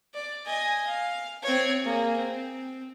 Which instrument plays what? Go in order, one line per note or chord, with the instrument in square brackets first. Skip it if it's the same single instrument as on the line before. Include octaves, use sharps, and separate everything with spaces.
[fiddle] D5
D#5 G#5
F5
C4 C#5
A#3 G#4
C4